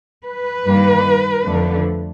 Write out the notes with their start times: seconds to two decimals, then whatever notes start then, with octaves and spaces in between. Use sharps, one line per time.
0.25 B4
0.65 G2 D#3 G3 A#3
1.45 F2 D3 F3 A3